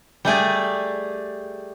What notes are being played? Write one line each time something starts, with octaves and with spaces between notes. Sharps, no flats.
G3 A3 G#4 D5